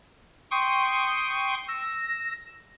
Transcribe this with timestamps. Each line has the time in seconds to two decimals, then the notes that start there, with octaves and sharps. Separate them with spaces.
0.51 G5 C6 C#6 D#6
1.68 E6 A#6